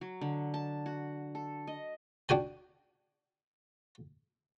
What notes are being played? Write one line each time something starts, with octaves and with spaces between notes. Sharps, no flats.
F#3
D3
A5
F#4
A4
D#5
D4 F#4 G5 G#5